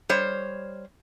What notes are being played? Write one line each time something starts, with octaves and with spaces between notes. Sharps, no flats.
G3 C5 C#5